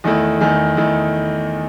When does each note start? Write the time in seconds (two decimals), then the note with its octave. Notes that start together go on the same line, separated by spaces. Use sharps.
0.04 E2 D#3 A3 E4
0.41 E2 D#3 A3 E4
0.77 E2 D#3 A3 E4